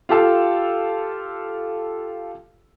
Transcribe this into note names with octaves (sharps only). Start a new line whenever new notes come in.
F4 G4 A4 F5